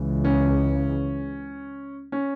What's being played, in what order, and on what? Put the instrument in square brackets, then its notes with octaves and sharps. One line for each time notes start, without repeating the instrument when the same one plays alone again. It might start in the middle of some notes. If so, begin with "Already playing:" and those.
Already playing: [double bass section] C#2 C#3 E3
[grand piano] C#4
C#4